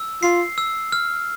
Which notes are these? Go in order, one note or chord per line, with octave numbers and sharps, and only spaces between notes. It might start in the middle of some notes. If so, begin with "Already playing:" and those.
Already playing: E6
F4 C7
E6
F6